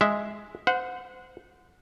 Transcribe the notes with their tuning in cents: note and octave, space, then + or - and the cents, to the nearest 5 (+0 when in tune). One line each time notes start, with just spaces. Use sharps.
G#3 +0 E5 +0
C5 -30 F#5 -20